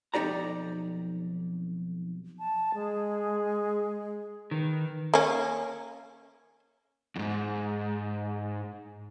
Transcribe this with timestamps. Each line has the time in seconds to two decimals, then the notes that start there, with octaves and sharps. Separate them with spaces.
0.14 B1 F2 D#4 G4 D5 A#5
2.39 A5
2.74 G#3 G#4
4.51 D#3 B4
5.14 A#3 C#4
7.16 E2 G#2